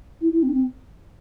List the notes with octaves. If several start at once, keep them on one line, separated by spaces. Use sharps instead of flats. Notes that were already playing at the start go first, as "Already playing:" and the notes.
E4
E4
C4
D4
C4